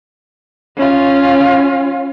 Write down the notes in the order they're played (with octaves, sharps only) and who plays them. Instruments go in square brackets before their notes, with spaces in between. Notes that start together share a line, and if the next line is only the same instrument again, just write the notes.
[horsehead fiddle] C#4 F4